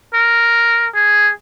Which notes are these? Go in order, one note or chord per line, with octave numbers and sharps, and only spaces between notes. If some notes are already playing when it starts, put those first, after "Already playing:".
A#4
G#4